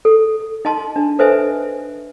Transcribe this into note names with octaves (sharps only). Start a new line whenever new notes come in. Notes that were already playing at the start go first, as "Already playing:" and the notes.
A4
D#4 D#5 A5 C6
D4
A4 B4 C5 D#5 E5 G#5